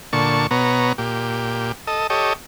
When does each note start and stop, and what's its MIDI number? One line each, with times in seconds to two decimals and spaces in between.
0.13 0.47 46
0.13 0.47 50
0.13 0.47 81
0.13 0.47 85
0.51 0.93 47
0.51 0.93 59
0.51 0.93 73
0.51 0.93 82
0.98 1.72 46
0.98 1.72 67
1.87 2.07 69
1.87 2.07 75
2.10 2.33 67
2.10 2.33 69
2.10 2.33 73
2.10 2.33 75